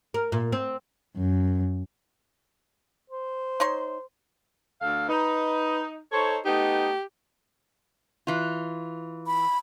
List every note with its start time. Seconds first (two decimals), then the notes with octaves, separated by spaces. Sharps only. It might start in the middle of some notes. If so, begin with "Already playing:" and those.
0.14 A#4
0.32 A#2
0.52 C4
1.17 F#2
3.10 C5
3.60 D#4 C#5 C6
4.81 D2 A4 F5
5.09 D#4 B4
6.12 D#4 A4 C5 C#5
6.45 A3 B3 D#4 G4
8.27 E3 F4
9.27 B5